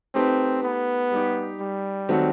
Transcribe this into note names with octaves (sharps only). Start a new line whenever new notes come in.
A3 C4 D#4 G4 B4
B3
G3 D#4 G4
G3
D#3 F#3 A3 C4 F#4